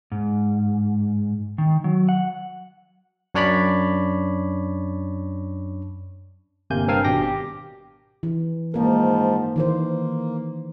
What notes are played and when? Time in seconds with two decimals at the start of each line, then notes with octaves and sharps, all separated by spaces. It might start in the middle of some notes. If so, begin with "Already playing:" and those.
0.12 G#2
1.58 D#3
1.84 F#3
2.09 F#5
3.34 F#2 D4 C#5 D5 B5
6.70 G1 C3 A#3 G#5 G6
6.88 G2 C4 A#4 F5 G#5 A5
7.05 G#1 B2 D4 G4 G5 A#6
7.22 G4
8.23 E3
8.74 G#2 F3 A#3 A#4
9.56 D#3 E3 A#3 C5